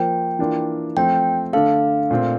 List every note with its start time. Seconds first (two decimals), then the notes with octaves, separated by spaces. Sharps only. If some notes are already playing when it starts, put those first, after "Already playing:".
Already playing: F3 A#3 F4 C5 G5
0.39 E3 A#3 D4 F4
0.97 F3 A3 C4 G5
1.53 D3 A3 D4 A4 F5
2.11 A#2 A3 C4